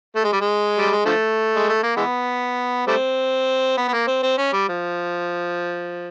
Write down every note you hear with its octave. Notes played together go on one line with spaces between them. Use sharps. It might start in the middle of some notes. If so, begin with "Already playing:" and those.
A3
G#3
G3
G#3
G3
G#3
D3 F3 A3
G#3
A3
A#3
E3 G#3 B3
G3 A3 C4
B3
B3
A#3
C4
C4
C#4
G3
F3